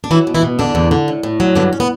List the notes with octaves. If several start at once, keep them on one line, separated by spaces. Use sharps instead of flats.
D4
E3 F#3 E4
B2
E3 E4
B2
E2 D3 D4
E2
D3
A2
A2
F#3
G2 D3 D4
C#4
B3